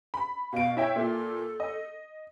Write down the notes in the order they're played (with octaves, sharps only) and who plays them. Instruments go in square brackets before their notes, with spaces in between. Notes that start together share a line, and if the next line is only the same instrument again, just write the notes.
[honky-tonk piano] B5
[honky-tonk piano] B2 D7 [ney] F5
[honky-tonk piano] E4 E5 G5 [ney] C#5
[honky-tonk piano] A#2 [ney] A4
[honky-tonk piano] D#5